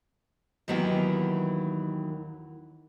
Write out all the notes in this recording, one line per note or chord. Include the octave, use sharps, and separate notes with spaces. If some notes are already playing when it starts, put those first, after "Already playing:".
D#2 D#3 E3 F#3 B3 G5